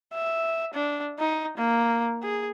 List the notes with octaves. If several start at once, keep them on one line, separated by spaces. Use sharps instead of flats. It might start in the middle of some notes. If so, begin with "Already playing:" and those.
E5
D4
D#4
A#3
G#4